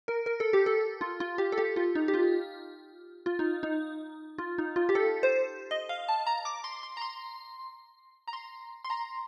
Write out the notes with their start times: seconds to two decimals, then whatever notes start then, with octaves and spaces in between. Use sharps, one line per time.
0.08 A#4
0.26 A#4
0.40 A4
0.53 G4
0.66 A4
1.01 F4
1.20 F4
1.38 G4
1.52 A4
1.58 G4
1.76 F4
1.95 D#4
2.08 G4
2.14 F4
3.26 F4
3.39 D#4
3.63 D#4
4.38 F4
4.58 D#4
4.76 F4
4.89 G4
4.95 A4
5.23 C5
5.71 D#5
5.89 F5
6.09 A5
6.27 A#5
6.45 D6
6.64 C6
6.83 C6
6.97 A#5
7.02 C6
8.28 A#5
8.33 C6
8.84 C6
8.90 A#5